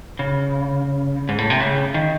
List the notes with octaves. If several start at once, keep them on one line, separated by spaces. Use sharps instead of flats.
C#3
G#2
A2
C3
C#3
D#3